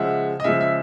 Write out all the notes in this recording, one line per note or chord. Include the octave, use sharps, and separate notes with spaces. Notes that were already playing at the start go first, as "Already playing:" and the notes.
Already playing: C#3 F3 G#3 E5 F#5
D#5
C#3 F3 G#3 E5
E5